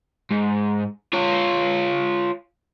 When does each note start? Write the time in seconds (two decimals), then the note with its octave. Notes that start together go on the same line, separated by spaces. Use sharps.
0.31 G#2
1.13 F4 C#5